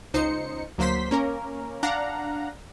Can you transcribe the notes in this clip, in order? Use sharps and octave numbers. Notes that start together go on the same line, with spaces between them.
C#2 D#4 C5 C#7
D2 F#3 A#3 C5 C6 B6
A#3 C#4 A#4
D4 F5 F#5 A#5